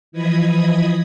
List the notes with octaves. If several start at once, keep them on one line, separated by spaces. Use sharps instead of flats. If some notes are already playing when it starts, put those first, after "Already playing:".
E3 F3 D#5 B5 D#6 G#6